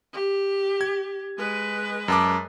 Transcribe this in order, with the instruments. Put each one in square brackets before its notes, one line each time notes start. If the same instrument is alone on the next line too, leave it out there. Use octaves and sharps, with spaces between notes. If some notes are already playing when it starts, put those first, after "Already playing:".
[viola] G4
[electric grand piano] G#6
[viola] G#3 B4
[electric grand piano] F#2 A5 D6